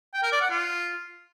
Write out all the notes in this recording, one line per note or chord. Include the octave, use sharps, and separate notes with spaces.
G5
A#4
D5
F#5
F4